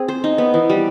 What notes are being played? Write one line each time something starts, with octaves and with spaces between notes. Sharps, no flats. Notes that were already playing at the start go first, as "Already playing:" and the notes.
Already playing: C4 G#4
C5
D#4
B3
E3
G3